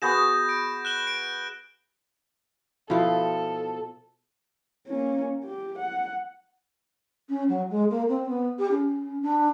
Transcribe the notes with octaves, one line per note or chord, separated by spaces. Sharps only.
B3 F#4 G#4 G6 A#6 E7
D7
F#6 E7 G7
D7
B2 F3 E4 F4 A4
A#3 C#4
G4
F#5
C#4
F#3
G#3
A#3
C4
B3
G4
C#4
D4